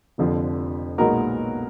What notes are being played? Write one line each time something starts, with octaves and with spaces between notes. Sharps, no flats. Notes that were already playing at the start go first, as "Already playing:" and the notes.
F1 F2 D3 F3
B1 A#2 G#3 B3 D#4 F#4 A#4